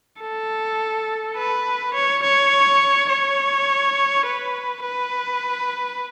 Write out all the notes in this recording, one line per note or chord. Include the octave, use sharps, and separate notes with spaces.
A4
B4
C#5
C#5
C#5
B4
B4